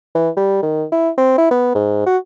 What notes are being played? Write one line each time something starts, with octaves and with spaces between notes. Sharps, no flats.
E3
G3
D#3
E4
C4
E4
B3
G#2
F#4